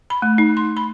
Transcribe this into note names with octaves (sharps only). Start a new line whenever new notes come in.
B5
A3
D#4
C6
B5